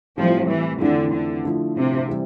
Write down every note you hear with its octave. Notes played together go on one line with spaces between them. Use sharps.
A2 F3 G3 C4 E4
E3
F2 D3 E3 A3 E4
D3
D3 F3 A3 E4
C3
E3 G3